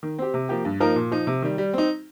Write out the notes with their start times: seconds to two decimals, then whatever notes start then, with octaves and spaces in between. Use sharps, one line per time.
0.03 D#3
0.19 C4 G4
0.34 C3
0.49 F3 A#3 G4
0.65 G2
0.80 F3 A#3 D#4 A#4
0.96 A#2
1.11 F3 D#4
1.27 C3
1.42 D#3 G3
1.58 G3
1.73 C4 D#4